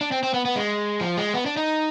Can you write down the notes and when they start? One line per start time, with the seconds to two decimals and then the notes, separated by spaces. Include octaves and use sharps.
0.01 D4
0.12 C4
0.23 C4
0.34 B3
0.45 B3
0.56 G#3
1.01 F3
1.17 G#3
1.34 B3
1.46 D4
1.57 D#4